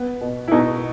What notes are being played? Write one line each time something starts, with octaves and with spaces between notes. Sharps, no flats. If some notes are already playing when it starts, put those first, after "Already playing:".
Already playing: B3
B2
E4
B2 D#4